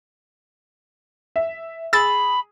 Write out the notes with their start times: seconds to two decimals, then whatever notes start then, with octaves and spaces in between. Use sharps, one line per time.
1.36 E5
1.93 G#4 B5 E6 A6